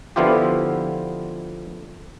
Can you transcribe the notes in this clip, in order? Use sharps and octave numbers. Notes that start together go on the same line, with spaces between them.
D3 F3 B3 E4 F4 G4